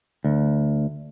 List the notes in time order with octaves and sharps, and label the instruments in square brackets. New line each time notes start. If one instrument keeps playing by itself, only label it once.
[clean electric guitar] D2